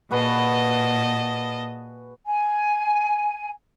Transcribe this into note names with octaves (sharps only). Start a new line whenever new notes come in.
A#2 F#4 G#4 B4 D#5 A5
G#5